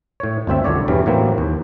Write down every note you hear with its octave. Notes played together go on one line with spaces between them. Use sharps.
A2 C#5
G1 D2 C4 E5
C2 F2 D3 C#5 D5
E2 G2 E3 F#3 G3
A2 E3 F#3 A#3 C4
D#2